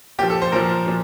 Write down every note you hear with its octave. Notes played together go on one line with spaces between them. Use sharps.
A#2 F3 G4
A4
C5
A#2 F3 A#4
A#2 F3